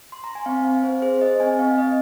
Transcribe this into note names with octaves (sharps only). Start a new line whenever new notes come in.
C6
A#5
G#5
C4 F5
C4 F5
C4 C5
G#4 C5
G#4 D#5
C4 G#5
C4 F5
C4 D#5